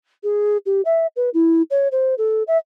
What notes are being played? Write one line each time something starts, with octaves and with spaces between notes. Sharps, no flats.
G#4
G4
E5
B4
E4
C#5
C5
A4
E5